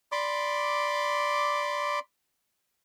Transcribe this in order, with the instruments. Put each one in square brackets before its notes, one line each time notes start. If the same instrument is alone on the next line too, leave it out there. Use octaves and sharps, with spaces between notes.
[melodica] D5 B5 C6 D6